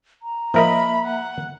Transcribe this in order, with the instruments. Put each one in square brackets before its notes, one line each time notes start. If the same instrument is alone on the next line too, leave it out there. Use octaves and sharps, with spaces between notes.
[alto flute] A#5
[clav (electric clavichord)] F3 A#4 D#5 [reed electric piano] A#3 E5 [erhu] B5
[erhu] F#5